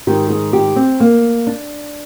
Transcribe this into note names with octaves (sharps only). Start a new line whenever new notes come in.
G#2 D#3 G4
G#4
G4
C4
A#3
D4